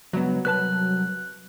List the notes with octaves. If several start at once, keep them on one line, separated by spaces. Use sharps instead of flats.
C#2 G2 F#3 B3
C2 B4 A5 F#6